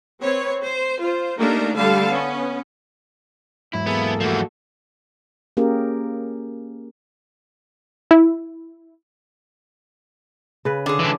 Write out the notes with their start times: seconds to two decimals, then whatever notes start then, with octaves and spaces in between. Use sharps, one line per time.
0.21 C4 B4 C#5
0.61 C5
1.01 F4 C5
1.38 A3 A#3 D4 D#4 G4 A#4
1.75 D3 G3 A3 A4 F5 A5
2.09 B3 C#4
3.73 E2 G#2 F#3 E4
3.87 A#3 B3 G#4 A4
4.21 E3 F3 A3 F#4
5.57 A#3 C#4 G4 G#4 A#4
8.11 E4
10.65 C#3 B4
10.86 D3 G#4
10.99 E3 D4